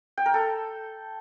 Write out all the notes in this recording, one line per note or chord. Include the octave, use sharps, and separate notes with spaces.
G5
A#4
A4